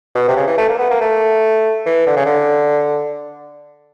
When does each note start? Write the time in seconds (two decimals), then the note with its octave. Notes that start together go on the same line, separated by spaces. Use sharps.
0.15 B2
0.28 C3
0.37 C#3
0.47 E3
0.58 A3
0.69 A#3
0.79 B3
0.90 A#3
1.01 A3
1.86 E3
2.07 D3
2.16 C#3
2.26 D3